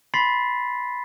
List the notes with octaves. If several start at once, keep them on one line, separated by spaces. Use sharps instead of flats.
B5 C6 A6 B6 C7